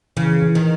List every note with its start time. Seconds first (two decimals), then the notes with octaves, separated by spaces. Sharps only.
0.17 C#3 E3
0.42 E3
0.55 D#3